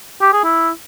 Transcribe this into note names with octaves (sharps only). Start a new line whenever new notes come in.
G4
G#4
E4